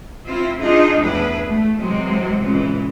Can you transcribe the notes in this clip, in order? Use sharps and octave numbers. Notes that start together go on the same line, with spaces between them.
C4 E4 F4 E5
D4 D#4 F4 G#4 D#5
E2 A2 D4 E4 G#4 B4
A3
C3 E3 F#3 G#3 C4
A#2 C#3 E3 G#3